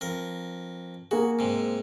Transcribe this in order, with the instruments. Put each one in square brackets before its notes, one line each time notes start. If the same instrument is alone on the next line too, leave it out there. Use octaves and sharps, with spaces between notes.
[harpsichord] F2 A#4
[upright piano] A#3 G#4 [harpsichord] F#4
[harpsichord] G#2 C3